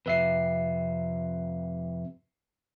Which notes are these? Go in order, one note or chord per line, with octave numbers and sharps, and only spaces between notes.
F2 C3 B4 E5 C7